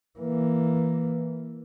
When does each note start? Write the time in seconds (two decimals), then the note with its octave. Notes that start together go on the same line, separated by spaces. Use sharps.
0.19 E3 A#3